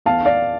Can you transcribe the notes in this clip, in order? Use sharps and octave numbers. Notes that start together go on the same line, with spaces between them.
E2 F5 A5
D5 F5